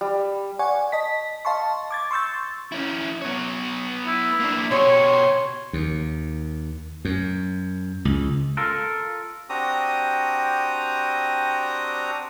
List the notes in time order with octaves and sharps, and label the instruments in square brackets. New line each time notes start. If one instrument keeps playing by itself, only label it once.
[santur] G3
[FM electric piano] D5 F#5 G#5 C#6
D#5 A5 B6
D#5 F5 A5 C6 C#6
D6 G#6 A6
C6 C#6 E6 G6 A6
[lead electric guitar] C#4 E4
B3 C#5
[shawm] E4
[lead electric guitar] A#3 D4
[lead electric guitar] B2 G4 [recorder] C#5 [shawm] C6
[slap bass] D#2
F#2
C#2
[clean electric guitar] F4 A4 A#4
[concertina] C4 D4 F#4 G4 A#5 D#6